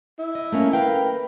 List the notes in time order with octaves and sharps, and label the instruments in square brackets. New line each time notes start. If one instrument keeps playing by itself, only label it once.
[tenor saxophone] E4
[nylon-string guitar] D#5
A3 A#3 C#4
[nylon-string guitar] A#4 F5 G5 [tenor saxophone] B4